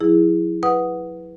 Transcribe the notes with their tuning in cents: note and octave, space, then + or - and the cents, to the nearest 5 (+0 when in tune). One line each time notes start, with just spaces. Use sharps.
F#3 -40 E4 +0 G#4 -10
B4 +0 F#5 +0 D#6 +0